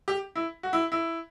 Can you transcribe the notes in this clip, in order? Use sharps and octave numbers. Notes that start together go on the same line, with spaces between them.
G4
E4
F#4
E4
E4